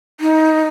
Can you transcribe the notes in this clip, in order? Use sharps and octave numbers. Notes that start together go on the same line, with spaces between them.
D#4